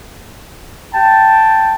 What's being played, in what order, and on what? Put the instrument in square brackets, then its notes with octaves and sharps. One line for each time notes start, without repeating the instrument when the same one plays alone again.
[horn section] G5 A5